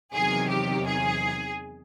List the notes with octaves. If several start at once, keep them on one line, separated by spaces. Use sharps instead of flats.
E2 C3 D#3 F#3 G#4
G4
G#4